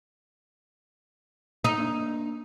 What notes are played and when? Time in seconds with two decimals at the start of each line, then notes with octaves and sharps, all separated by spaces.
1.64 D#4
1.78 A#3 D4